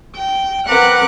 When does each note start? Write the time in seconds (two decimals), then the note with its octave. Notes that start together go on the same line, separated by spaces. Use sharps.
0.15 G5
0.68 C4 A#4 B4 F#5 D6 F#6